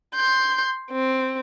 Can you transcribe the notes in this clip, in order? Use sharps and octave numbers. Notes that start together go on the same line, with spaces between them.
C6 G6
C4